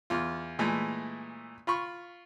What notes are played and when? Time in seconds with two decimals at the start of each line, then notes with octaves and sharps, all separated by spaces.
0.10 E2 F4
0.59 A#2 E3 G#3 A3
1.67 F4 B5 C#6